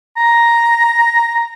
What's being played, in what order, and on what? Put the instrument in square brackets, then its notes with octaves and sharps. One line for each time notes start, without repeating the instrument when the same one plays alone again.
[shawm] A#5